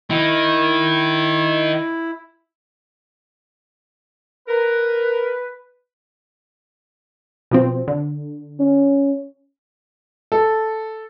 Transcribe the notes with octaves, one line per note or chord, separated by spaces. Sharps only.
D#3 E4
A#4 B4
B2 F3 C4
D3
C#4
A4